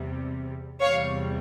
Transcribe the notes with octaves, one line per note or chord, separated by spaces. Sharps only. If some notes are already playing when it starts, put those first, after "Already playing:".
Already playing: E2 C3 G3
E2 C3 G3 C#5 F5